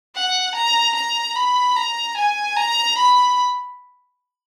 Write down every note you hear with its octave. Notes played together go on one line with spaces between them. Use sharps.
F#5
A#5
A#5
B5
A#5
G#5
A#5
B5